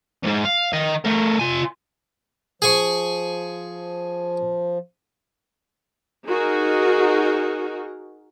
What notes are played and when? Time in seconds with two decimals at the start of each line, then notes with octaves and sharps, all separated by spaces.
0.23 E2 G#2
0.45 F5
0.73 D#3 D#5
1.05 A3 A#4
1.39 F4 G#5
2.62 F3 G#4 G#5 C#6
6.27 D#4 F#4 G#4 A#4